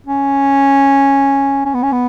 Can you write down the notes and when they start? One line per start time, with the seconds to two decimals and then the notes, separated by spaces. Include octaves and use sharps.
0.07 C#4
1.65 C#4
1.74 B3
1.83 C#4
1.92 B3